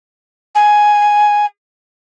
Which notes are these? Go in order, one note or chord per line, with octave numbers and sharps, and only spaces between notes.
G#5